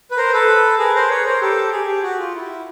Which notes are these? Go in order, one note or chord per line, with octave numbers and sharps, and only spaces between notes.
B4
A#4 C5
A4 B4
G#4 A#4
A#4 C5
B4 C#5
A#4 C5
G4 A4
G#4
G4
F#4
F4
E4